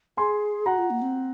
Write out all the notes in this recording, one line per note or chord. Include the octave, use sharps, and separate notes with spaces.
G#4 G#5 C6
F#4 F#5 A#5
F4
A#3
C4